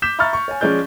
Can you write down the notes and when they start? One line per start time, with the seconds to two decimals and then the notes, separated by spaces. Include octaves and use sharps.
0.02 D6 G6 B6 E7
0.19 E5 A#5 B5 C#6 F6 A6
0.33 C#6
0.48 C#5 G#5
0.61 F3 G#3 C#4 D5 G6